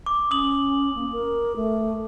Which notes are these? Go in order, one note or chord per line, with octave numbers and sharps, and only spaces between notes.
D6
C#4 D#6 F#7
A#3
A#4
A3